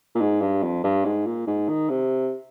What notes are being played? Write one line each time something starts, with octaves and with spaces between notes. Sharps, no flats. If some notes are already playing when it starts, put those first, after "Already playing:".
A#2
G#2
G2
F2
G2
G#2
A#2
G#2
D#3
C3